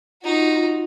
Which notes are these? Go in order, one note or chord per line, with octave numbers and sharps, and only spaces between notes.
D#4 F4 F#4